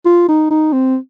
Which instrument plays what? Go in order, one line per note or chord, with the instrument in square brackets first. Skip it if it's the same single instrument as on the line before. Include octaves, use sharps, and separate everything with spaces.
[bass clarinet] F4
D#4
D#4
C4